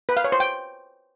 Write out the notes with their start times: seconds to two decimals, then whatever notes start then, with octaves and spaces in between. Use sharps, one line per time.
0.09 B4
0.17 F5
0.24 C#5
0.32 C5
0.40 G5